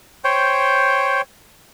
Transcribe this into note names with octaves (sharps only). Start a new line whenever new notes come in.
C5 C#5 G5